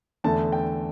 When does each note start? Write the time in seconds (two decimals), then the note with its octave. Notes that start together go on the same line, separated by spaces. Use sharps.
0.24 E2 D3 A3 A5
0.52 G5